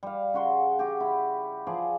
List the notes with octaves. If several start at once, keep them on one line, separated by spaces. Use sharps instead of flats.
G3 F5
C#3 F#4 C6
F#4 G4
E4 B5
F3 G#4 D5